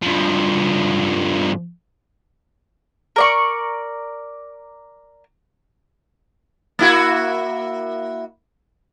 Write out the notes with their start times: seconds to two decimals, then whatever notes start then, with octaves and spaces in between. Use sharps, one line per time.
0.02 G2 F3
3.16 A#4 D5 C#6
6.79 A#3 E4 F#4